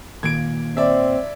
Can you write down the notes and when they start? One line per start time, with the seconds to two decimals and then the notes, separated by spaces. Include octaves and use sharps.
0.23 A#2 D#3 A#3 G#6 D7
0.77 C4 D5 E5